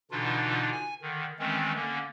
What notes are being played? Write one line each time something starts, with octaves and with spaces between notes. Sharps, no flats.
B2 D3 E3 D4 D#4 F4
G#5
D3 D#3
D#3 E3 G#3 A3 C4 C#4
D3 A#3 C#4